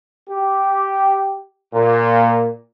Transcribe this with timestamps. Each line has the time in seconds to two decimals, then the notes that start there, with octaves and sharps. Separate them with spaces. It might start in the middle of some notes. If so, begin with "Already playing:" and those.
0.29 G4
1.73 A#2